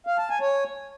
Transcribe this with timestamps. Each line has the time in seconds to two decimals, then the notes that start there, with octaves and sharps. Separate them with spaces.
0.07 F5
0.18 A5
0.30 G#5
0.41 C#5